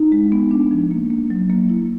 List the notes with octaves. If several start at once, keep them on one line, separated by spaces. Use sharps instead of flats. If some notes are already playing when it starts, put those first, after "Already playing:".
Already playing: D#4
G#3
B3
D4
F3
A#3
A#3
F#3
A#3
E4